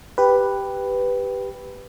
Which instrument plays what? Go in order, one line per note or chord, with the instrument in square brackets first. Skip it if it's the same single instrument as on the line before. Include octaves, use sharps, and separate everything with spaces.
[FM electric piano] G4 B4